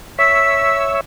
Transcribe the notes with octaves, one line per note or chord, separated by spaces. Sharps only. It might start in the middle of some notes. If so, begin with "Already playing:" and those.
C#5 E5 E6 B6